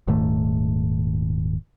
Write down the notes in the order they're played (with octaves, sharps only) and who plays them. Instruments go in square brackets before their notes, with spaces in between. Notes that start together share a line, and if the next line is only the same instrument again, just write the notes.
[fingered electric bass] D#1 G#2 D#3 A3